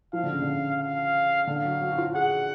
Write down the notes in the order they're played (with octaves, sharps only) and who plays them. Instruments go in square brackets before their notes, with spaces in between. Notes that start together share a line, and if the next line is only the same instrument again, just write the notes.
[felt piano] F3 [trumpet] F5
[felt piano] D3
C#3
D3
[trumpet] F5
[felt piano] D3 [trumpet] F5
[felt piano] F#3
F#3
F#4
F4
[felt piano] G#4 [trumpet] F#5